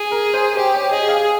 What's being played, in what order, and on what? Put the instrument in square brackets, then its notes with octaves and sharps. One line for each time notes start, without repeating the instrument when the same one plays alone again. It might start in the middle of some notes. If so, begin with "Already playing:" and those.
Already playing: [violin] G#4
[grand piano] A#4
C5
[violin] G4 [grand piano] C5
[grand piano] C#5
[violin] G#4 [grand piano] D#5
[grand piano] F5